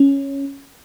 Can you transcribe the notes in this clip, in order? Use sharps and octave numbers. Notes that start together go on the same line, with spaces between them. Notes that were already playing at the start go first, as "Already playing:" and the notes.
Already playing: C#4